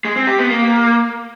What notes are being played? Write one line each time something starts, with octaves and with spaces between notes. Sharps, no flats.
G#3
C4
G4
B3
A#3